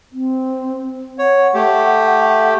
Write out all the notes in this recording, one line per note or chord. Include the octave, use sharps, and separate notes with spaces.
C4
C#5 F#5
A3 G4